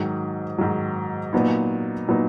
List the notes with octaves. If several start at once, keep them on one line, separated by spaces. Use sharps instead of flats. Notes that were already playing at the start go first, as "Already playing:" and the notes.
Already playing: G#2 D#3 F#3
G#2 D#3 F#3
A#2 F#3 B3 D#4
A#2 F#3 B3 D#4